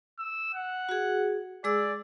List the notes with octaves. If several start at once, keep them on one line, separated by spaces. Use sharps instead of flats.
E6
F#5
F#4 G#4
G#3 G#4 D5 E6